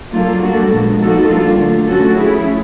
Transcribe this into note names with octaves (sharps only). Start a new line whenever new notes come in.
F#3 A#3 D4 F4 A4
G3 A#3 D4 F#4 A4
A#2 F3 G#3 B3
F3 A#3 D#4 F#4 A4
G3 A#3 D4 F4
D3 F#3 A3
A3 C#4 F#4 A4
F3 A3 C#4 E4 G#4